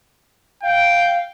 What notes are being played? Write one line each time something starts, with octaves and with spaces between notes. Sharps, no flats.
F5 G5